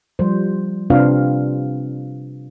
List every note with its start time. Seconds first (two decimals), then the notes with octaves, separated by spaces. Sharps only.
0.19 F3 G3 C5
0.90 C3 C4 D4 F4 B4 F5